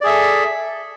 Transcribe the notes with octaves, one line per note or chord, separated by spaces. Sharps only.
G#4 A4 D5 E5